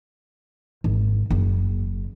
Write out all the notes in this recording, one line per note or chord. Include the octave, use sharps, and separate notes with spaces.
G#1
F#1